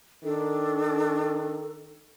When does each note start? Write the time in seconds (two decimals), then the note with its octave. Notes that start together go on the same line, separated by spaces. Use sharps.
0.24 D#3 D4 A4